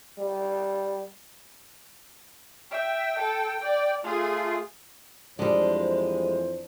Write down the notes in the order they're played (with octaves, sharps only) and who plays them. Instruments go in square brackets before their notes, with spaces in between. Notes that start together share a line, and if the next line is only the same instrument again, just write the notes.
[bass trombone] G3
[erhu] E5 [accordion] G5
[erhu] A4
D5
[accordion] A3 F4 [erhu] G#4
[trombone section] F2 E3 C5 [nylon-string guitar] G3 G#3 [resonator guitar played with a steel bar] D4